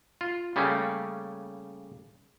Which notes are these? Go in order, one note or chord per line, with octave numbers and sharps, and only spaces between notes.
F4
C#3 G3 A3 A#3 C#4